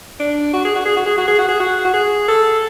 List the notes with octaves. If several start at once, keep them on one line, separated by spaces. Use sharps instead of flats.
D4
F#4
G#4
F#4
G#4
F#4
G#4
F#4
G#4
F#4
G#4
F#4
F#4
G#4
A4